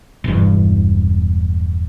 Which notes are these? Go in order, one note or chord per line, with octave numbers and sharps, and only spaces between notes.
E1 E2 G2